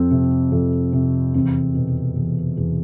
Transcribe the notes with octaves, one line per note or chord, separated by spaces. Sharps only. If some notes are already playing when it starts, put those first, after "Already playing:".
Already playing: F2 C4
C3
F2
C3
E2 C4
B2
E2
E2